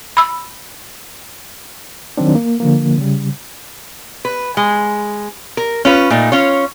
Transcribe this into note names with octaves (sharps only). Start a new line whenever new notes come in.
B5 E6
D#3 F#3 C4 D4
A#3
D3 F3 A#3
C#3 G3
B4
G#3
A#4
C#4 F4 B4
A#2 A3 D#4
C#4 F4 C#5